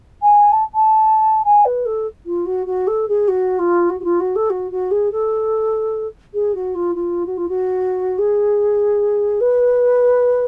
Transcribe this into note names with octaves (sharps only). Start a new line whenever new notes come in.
G#5
A5
A5
G#5
B4
A4
F4
F#4
F#4
A4
G#4
F#4
F4
F#4
F#4
F4
F#4
A4
F#4
F#4
G#4
A4
G#4
F#4
F4
F4
F#4
F4
F#4
G#4
B4